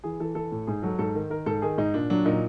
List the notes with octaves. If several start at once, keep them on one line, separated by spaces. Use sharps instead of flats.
E3 G#4
E3 A4
E3 A4
A2
G#2 G#4
F#3 A4
G#2 A4
D#3
D#3 A#4
G#2 A4
D#3 G#4
G#2 D#4
A#2 D4
F#3 D4
A#2 D#4